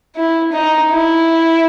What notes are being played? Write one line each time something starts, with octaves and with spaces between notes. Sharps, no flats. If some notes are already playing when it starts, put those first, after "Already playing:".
E4
D#4
E4